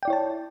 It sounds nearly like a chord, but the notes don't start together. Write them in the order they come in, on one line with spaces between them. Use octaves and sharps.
G5 D5 E4 C#5 A5